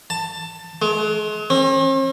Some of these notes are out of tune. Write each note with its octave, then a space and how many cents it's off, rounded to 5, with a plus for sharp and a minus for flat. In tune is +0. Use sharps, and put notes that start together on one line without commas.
A5 +15
G#3 +40
C4 +45